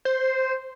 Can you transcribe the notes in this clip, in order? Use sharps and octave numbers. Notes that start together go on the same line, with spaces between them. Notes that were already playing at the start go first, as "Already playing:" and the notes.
C5